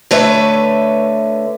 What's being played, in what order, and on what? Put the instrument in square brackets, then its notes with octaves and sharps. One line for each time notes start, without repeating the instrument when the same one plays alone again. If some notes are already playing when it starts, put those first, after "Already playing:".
[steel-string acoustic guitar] D3 A3 B4 C#5 E5